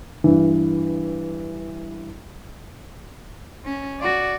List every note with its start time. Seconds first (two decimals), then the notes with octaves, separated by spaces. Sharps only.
0.24 G2 E3
3.65 C#4
4.00 F#4 D5